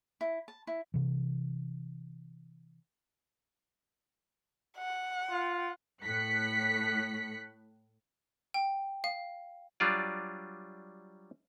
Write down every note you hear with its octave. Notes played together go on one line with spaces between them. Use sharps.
E4
A5
E4
C3 E3
F#5
F4
A2 F#6 B6 C#7
G5
F5
F#3 G3 D4 F4 D5